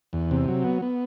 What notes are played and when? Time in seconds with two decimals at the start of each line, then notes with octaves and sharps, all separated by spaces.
0.13 E2
0.31 C3
0.48 F#3
0.64 B3
0.82 B3